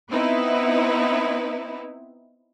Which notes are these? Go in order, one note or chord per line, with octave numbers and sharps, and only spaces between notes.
B3 C4 D#4 E4 B4